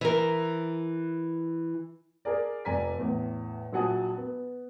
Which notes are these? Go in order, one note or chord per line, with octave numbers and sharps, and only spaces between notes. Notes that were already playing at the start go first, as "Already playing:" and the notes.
E3 A#4
G#4 A#4 D5
F1 D5 G#5 A#5 B6
E2 A2
A#1 F#3 F#5 G#5 A5 D#6
B3